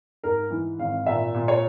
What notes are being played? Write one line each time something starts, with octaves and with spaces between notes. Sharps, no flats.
G#2 A#4
E3
G#1 F5
A#2 E5
A#2
C#5